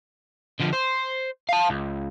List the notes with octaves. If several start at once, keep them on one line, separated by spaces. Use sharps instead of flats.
D3 F3
C5
F5 A5
C#2